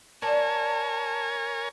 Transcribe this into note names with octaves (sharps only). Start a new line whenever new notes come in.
A#4 C#5 D5 G#5 A5